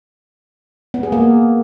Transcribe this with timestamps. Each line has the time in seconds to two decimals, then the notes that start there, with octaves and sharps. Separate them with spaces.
0.94 B3
1.03 G#4
1.12 A#3